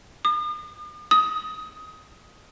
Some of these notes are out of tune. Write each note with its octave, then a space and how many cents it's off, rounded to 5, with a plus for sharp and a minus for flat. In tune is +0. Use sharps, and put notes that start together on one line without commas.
D#6 -45
D#6 +15